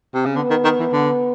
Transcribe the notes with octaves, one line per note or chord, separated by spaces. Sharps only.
C3
C#3
D3 B3
D#3
D#3
E3
D3